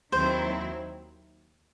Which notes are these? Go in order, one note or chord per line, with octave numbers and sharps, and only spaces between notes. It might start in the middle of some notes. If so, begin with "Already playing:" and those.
D#2 D#3 F#3 C4 E4 C5